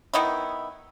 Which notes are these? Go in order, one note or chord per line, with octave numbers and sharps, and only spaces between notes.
D#3 B3 D#4 E4